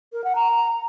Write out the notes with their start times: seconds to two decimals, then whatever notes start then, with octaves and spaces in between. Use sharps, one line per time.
0.13 A#4
0.24 F#5
0.36 A#5